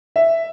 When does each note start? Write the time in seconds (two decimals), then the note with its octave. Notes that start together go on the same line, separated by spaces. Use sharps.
0.16 E5